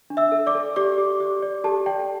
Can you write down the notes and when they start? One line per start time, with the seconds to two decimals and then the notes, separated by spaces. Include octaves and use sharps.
0.10 D4
0.17 E5 E6
0.32 A4
0.46 D5 D6
0.55 A4
0.76 G4 D5 D6
0.98 G4
1.20 G4
1.43 D5
1.64 G4 A4 A5
1.86 D5 G5